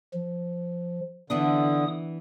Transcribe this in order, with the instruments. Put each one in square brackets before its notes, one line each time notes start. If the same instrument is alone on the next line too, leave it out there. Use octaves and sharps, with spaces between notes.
[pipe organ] F3
[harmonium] D3 [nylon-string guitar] E3 B3 D4 [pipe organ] D#6